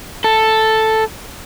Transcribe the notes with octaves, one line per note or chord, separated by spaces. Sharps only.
A4